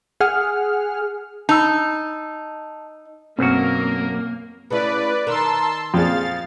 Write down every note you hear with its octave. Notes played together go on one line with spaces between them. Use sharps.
G#4 F#5 F6
D#4 A5 E6
B1 F#2 A#3 C4 F#4 A#4
C#3 A3 E4 B4 D5
D#3 D#4 A#4 A5 C6 E6
F2 A#2 G#4 F5 A6